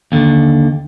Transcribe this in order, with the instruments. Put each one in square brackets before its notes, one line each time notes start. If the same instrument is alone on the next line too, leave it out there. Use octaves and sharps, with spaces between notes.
[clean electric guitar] D#2 D3